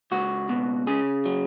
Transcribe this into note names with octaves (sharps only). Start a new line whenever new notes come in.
C#2 F#4
B2
C#3 G#4
F#3